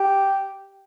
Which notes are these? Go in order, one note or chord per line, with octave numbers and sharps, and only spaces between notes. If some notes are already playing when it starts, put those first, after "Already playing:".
Already playing: G4